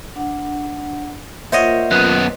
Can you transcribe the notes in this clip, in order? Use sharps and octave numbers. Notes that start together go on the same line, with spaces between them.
D4 F#5
A#3 F4 A#4 C5 C#5 D#5 E5 F#5
F#2 B3 F#6